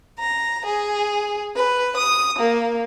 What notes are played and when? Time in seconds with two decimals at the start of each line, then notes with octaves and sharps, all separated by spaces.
0.19 A#5
0.66 G#4
1.55 B4
1.97 D#6
2.38 A#3